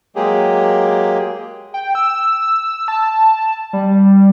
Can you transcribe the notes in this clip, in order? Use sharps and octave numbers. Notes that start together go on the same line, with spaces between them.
F#3 G#3 A#3 G4 G#4
G5
E6
A5
G3